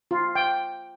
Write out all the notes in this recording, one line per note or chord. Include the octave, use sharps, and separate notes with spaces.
F4
G5